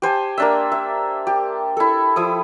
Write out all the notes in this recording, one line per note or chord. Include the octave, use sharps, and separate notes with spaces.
G4 C5 G#5 A5
A#3 D4 E5
E5
G4
E4 A4
F3 E4 D#6